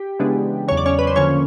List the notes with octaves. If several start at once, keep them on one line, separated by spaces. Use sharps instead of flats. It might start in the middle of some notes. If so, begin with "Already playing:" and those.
Already playing: G4
C#3 E3 G#3 B3 D4
E2 C#3 F#3 C#5
D5
C#4 C#5
B4
C5
D3 F3 A#3 C#4 C#5